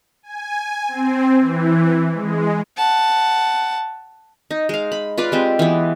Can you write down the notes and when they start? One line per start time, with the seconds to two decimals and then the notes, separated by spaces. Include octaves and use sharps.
0.23 G#5
0.88 C4
1.39 E3
2.13 G#3
2.77 F#5 A5
4.51 D#4
4.69 G#3 F5
4.92 B5
5.18 F4 B4 D5 F5
5.32 G#3 C4 G4
5.59 E3 B3